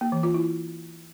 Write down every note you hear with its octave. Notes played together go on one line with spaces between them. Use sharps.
A#3
E3
F4
E4